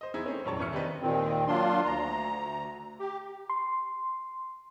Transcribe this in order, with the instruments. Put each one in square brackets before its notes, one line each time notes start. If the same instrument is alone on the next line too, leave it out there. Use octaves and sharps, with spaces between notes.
[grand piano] C5 D#5
E2 D#4 E4 G#4 G#6
A3 C4 C#4
E1 A#1 F#2 C#5 A5 C#6
G#1 E3 C#4 E5 F6 C#7
D#3 G3 C4 D4 B4 D#5
[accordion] D#2 A#2 D#3 C4
F#3 A#3 D4 F4 C6
D2 A#5
G4
[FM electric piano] C6